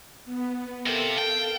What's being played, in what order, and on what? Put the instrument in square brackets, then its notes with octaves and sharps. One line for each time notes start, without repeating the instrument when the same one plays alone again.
[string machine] B3
[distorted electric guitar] C3 [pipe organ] A4 A#4 [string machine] F5 A5
[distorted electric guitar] G5